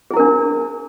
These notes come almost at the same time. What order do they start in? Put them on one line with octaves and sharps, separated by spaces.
G#4 E4 A#4 D4